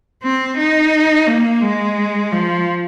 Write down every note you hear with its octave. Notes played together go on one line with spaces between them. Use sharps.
C4
D#4
A#3
G#3
F3